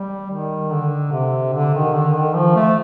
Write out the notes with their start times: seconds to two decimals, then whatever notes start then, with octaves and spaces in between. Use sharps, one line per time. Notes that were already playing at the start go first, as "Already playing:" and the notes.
Already playing: G3
0.31 D#3
0.71 D3
1.12 C3
1.53 D3
1.74 D#3
1.93 D3
2.14 D#3
2.34 F3
2.56 A3